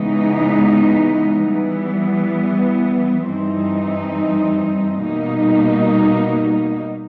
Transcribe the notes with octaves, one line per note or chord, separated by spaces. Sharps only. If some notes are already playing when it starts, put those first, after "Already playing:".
Already playing: C#3 E3 G#3 B3 D#4
E3 G3 B3
G2 E3 G3 C4 D#4
B2 G3 A#3 D#4